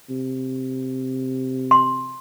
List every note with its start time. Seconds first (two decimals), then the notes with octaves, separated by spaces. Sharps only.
0.10 C3
1.71 C6